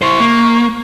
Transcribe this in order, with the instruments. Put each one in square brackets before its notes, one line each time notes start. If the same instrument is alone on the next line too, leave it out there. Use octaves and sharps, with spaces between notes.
[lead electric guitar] E4 C5 [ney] C#6
[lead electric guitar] A#3